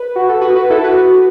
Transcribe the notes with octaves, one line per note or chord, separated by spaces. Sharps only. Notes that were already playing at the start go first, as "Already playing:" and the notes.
Already playing: B4
F#4
A4
F#4 B4
F#4 B4
E4 A4
F#4 B4